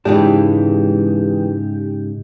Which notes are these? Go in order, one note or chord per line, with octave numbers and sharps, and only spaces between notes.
G#2 C#3 E3 G#3 D4 D#4 G4